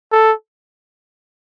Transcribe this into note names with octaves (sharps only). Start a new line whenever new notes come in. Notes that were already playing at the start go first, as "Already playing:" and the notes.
A4